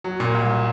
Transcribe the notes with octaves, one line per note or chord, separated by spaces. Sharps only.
F#3
A#2
C2